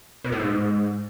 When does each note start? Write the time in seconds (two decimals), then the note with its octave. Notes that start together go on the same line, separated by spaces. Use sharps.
0.24 B2
0.32 A2
0.40 G#2